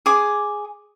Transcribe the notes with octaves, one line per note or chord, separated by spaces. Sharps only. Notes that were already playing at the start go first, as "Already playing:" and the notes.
G#4 D6